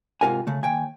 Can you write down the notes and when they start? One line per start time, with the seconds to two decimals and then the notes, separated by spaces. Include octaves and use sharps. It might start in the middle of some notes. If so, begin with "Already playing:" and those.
0.21 G#2 C3 F4 A#4 F#5 G#5
0.47 C#3 A3
0.63 D#2 G5 G#5